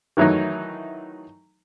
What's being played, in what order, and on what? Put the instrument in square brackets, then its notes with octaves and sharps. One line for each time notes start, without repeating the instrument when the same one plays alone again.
[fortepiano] D#3 E3 F#3 A3 D#4